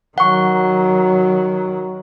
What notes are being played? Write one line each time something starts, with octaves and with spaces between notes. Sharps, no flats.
D#3 F#3 F#5 C#6